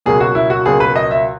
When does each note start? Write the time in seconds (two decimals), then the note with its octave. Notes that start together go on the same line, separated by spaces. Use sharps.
0.06 C#2 B2 F#3 A#3 G#4
0.20 F#4
0.35 E4
0.50 F#4
0.66 C#2 B2 F#3 A#3 G#4
0.80 B4
0.96 D#5
1.11 E5